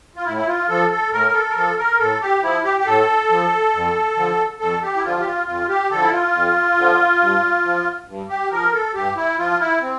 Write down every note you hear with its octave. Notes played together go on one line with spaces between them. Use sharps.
F4
A2 E4
E4
F4
F3 A4
A4
A2 A#4
A#4
A4
A#4
F3 A4
A#4
A2 A4
G4
F3 E4
G4
G4
A2 A4
F3
F2
D3 F3
F2 A4
G4
E4
D3 F3 F4
G4
F4
F2 F4
G4
D3 F3 A4
E4
F4
F2
D3 F3
G2
F3
G2
G4
F3 A#4
A4
G2 G4
E4
F3 F4
E4
C4